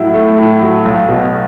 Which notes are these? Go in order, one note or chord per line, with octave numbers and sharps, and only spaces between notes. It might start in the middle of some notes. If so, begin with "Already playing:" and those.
Already playing: A2 F#3 E4
A3
A2
F#3
B1
B2